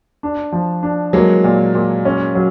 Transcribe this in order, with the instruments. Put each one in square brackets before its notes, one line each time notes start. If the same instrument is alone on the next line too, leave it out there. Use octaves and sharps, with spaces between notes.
[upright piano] D4
F3
D4
[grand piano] F#3 G#3 [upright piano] A#3
[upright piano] A#2
A#2
C#4
F#3